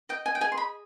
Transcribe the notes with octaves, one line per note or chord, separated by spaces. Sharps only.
D#5 G5
G#5
G5
G#4 G#5
C6
B5